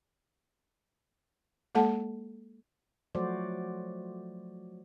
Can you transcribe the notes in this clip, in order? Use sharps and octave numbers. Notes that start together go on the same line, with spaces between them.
G#3 A#3 A4 F#5 A5
F3 F#3 A3 F#4 C5 D5